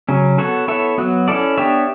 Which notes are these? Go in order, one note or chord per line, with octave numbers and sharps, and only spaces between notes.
C#3 F#3 C#4
B3 F#4 A4 C#5
B3 E4 A4 C#5 E5
F#3 B3 F#4
C#4 E4 A4 D5
B3 D4 G4 C#5 E5